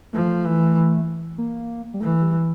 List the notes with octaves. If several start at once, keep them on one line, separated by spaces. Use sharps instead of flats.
F3 A3
E3
A#3
G3
E3 A3
G3